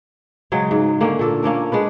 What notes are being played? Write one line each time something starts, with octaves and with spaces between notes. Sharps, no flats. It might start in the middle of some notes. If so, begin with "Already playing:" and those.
C#3 F#3 G#3
G#2
D3 A#3 C#4 D4
A#2 A4
A#3 C#4 D4 A#4
G#3 D4 B4